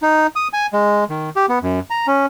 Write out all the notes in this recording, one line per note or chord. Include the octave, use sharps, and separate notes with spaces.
D#4
D#6
G#5
G#3
D#3
G4
B3
F#2
A#5
C#4